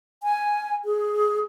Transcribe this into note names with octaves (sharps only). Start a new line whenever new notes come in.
G#5
G#4